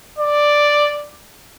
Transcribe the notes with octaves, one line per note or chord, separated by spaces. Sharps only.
D5